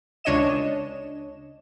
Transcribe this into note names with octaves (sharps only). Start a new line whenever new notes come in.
C#2 D4 C#5 D#5 E7